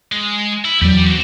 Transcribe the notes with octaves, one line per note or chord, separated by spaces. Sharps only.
G#3
E4
E2 F#3 G4 D5
C4 F#4